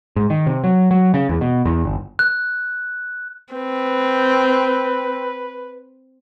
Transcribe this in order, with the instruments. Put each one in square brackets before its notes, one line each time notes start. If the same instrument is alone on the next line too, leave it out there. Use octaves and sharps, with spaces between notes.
[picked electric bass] G#2
D#3
C3
F#3
F#3
C#3
E2
B2
E2
G1
[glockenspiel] F#6
[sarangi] C4 [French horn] B4